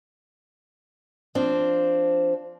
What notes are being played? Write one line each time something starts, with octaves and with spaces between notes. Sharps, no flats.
F3 C4 D4